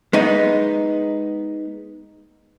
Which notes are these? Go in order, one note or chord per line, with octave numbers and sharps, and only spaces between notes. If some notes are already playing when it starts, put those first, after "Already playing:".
G#3 B3 D#4